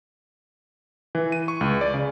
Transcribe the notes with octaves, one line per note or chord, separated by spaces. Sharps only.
E3
D#7
C#6
C#2
D5
C#3